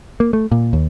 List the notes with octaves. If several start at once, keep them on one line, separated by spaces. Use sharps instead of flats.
A#3
A3
A#2
D#2